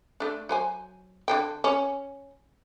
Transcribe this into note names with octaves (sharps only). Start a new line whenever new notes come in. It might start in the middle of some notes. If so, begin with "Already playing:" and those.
A3 D4
F#3 C5 G#5
D3 E3 G5
C#4